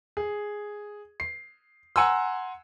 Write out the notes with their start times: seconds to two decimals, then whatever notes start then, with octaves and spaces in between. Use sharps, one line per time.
0.17 G#4
1.20 C7
1.96 F#5 G#5 A#5 C6 E6